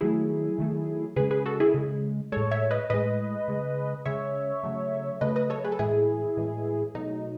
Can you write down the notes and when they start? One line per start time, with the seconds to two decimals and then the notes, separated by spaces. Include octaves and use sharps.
0.01 D#3 F#3 A3 E4 G#4
0.58 D#3 F#3 A3
1.16 C#3 G#3 G#4 B4
1.31 G#4 B4
1.46 F#4 A4
1.60 E4 G#4
1.74 C#3 G#3
2.32 A2 G#3 A4 C#5
2.51 C#5 E5
2.71 B4 D#5
2.90 A2 G#3 B4 D#5
3.48 C#3 G#3
4.05 C#3 G#3 C#5 E5
4.64 C#3 F#3 A3
5.21 C#3 F#3 A3 B4 D#5
5.36 B4 D#5
5.50 A4 C#5
5.64 G#4 B4
5.72 A4
5.79 A2 E3 G#3 E4 G#4
6.37 A2 E3 G#3
6.95 B2 F#3 A3 D#4